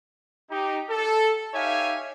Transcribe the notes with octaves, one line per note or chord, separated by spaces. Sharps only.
D#4 G4
A4
D#4 G4 C#5 E5 F5 G#5